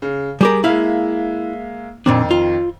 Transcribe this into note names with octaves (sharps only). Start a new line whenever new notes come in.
C#3
G3 G4 G#4 A#4
G#3 A#3 E4 E5 F5
F2 A#2 D#3 C4 D4
F4